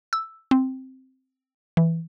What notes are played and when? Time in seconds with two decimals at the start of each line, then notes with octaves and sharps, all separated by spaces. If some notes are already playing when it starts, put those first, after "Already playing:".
0.13 E6
0.51 C4
1.77 E3